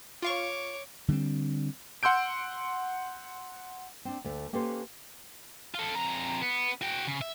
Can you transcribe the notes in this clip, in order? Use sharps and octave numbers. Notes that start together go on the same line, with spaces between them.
F4 C#5 F5 C#6 D6
D3 G3 G#3 C4
F#5 C6 E6 G6 D7
C4 D4
D2 A3
A#3 C#4 G4 A4 B4 C5
F4 A4
F2 A#5
B3
F#4 G5
C#3
E5